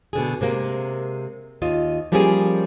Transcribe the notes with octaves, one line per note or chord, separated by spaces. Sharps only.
B2 D3 G#4
C3 G#3 A#3
D#2 F4 D#5
F3 G3 A#3 C#4 G4 G#4